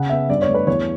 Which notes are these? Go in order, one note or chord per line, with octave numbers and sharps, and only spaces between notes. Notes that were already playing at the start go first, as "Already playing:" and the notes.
Already playing: C#3 F#5
B3 E5
G2 D5
C#5
A3
B4
E2 C#5